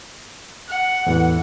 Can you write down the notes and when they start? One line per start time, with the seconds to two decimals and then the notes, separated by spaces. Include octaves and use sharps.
0.69 F#5
1.07 E2 A2 E3